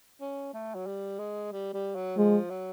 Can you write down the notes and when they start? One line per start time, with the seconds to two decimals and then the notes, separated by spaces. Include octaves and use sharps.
0.21 C#4
0.54 A3
0.75 F#3
0.87 G3
1.19 G#3
1.53 G3
1.74 G3
1.95 F#3
2.17 F3 G#3
2.50 F#3